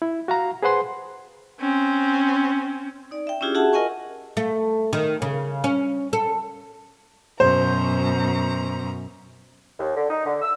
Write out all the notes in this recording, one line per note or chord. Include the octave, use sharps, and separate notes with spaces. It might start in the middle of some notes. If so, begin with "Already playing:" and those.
E4
F#4 F5 A#5
G#4 B4 C5 F#5 C6
C4 C#4
D#4 D5
E5 G5
C#4 D4 E4 F4 G4 G#4
F#4 G#4 E5 F#5 A5
F4 A#4 D#5 F#5 G#5 C#6
A3
D#3
C#3
C#4
A4
F#2 B2 C5 A#5
D#2
D3
D#4
D3
E6